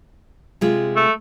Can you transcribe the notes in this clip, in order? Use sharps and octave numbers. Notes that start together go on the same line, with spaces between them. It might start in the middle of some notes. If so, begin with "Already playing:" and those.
C3 G#3 F4
A3